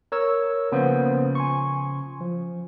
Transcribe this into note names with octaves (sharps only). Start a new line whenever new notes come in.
A#4 C#5 E6
C#3 F3 A#3 B3 C5
G#5 C6 C#6
F3